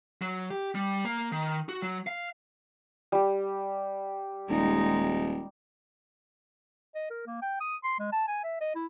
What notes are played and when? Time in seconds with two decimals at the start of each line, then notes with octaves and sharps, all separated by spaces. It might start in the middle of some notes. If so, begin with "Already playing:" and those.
0.22 F#3
0.50 G4
0.75 G3
1.05 A#3
1.32 D#3
1.69 F#4
1.82 F#3
2.07 F5
3.12 G3 G4
4.50 D#1 G#3 D#4
6.95 D#5
7.10 A#4
7.27 A#3
7.42 G5
7.61 D#6
7.84 C6
7.99 G#3
8.12 A5
8.28 G#5
8.44 E5
8.61 D#5
8.75 E4